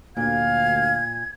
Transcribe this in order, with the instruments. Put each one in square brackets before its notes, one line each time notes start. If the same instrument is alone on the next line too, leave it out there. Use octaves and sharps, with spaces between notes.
[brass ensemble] D2 F5 [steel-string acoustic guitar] A#2 [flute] G#6